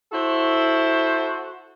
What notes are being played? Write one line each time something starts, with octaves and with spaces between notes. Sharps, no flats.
E4 F#4 A4 C5